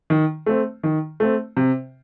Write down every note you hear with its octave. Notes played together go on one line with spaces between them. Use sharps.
D#3
A3 C4
D#3
A3 C4
C3